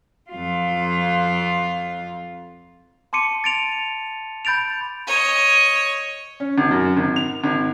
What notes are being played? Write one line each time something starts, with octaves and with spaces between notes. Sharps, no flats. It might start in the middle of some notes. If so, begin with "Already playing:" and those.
F2 F4
A5 C6 D6 C#7 D#7
A6 D7 F7
B5 G6 A6 D7 F7
C#5 D#5
C#4
G#1
F#2
G#1
F7
G#1